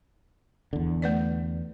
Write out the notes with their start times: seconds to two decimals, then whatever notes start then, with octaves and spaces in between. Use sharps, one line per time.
0.73 E2 D3
1.02 A3 B4 D5